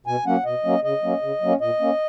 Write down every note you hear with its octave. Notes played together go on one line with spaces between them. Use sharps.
B2 G#5
F#3 A#3 C#4 F#5
B2 D#5
F#3 A#3 C#4
C#3 D#5
F#3 A#3 C#4
C#3
F#3 A#3 C#4
A#2 D#5
A#3 C#4